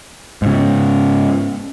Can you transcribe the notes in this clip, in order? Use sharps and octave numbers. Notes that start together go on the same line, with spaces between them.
G#2 C#3